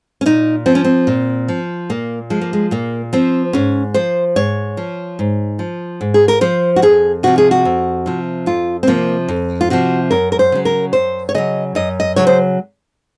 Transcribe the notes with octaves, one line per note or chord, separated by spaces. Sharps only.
C#4
A#2 D#4
F3 C4
C#4
C4
A#2
F3
A#2 A#3
F3 G#3
A#3
G#3
A#2 A#3
F3 C4
G#2 C#4
F3 C5
G#2 C#5
F3
G#2
F3
G#2
G#4
A#4
F3 C5
F#4
F2 G#4
C3 F3 F#4
G#4
F#4
F2
C3 F3
F2 F4
C4
C3 F3 A#3
F2
F4
C3 F3 F#4
F#2 A#4
A#4
C5
C#3 F#3
A#4
F#2 C5
C#5
C#3 F#3 D#5
F#2 D#5
D#5
C#3 F#3 C#5
C5